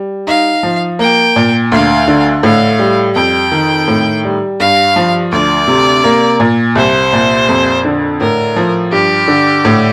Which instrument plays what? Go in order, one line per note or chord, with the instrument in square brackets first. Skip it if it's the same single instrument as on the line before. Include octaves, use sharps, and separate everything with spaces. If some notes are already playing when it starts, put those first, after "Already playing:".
Already playing: [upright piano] G3
[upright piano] D#4 [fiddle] F5
[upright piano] F3
[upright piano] A#3 [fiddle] G5
[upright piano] A#2
[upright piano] D2 [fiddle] F5
[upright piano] D3
[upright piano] A2 [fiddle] F5
[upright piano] G3
[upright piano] F2 [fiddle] G5
[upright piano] D#3
A2
G3
[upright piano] G2 [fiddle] F5
[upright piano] F3
[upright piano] D2 [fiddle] D5
[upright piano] C3
A#3
A#2
[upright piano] C2 [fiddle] C5
[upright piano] A#2
F2
D3
[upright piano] A2 [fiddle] A#4
[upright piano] F3
[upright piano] G2 [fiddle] G4
[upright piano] D3
A2